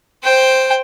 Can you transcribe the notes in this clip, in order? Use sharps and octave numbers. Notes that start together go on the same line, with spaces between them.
C5 G5